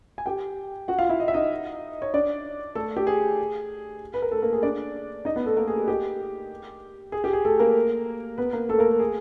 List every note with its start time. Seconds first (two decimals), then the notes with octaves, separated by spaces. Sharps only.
0.18 G#5
0.26 G4 G5
0.88 F#4 F#5
0.99 F4 F5
1.09 E4 E5
1.20 D#5
1.28 E5
1.34 D#4 D#5
2.02 C#5
2.14 D4 D5
2.75 A3 A4
2.97 G4
3.07 G#4
4.14 B4
4.22 A#4
4.31 A3 A4
4.42 A#3 A#4
4.53 G#4
4.63 D4 D5
5.25 D#4 D#5
5.36 B3 B4
5.46 A3 A4
5.57 A#3 A#4
5.68 G#4
5.77 G4
5.88 G4
7.12 G#4
7.24 G4
7.33 G#4
7.45 A3 A4
7.59 A#3 A#4
8.38 B3 B4
8.53 A#3 A#4
8.69 A3 A4
8.79 A#3 A#4
9.00 G#4